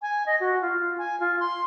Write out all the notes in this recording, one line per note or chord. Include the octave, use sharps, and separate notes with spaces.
G#5
D#5
F#4
F4
G#5
F4
C6